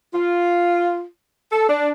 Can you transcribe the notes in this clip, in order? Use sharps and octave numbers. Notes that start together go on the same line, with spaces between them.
F4
A4
D4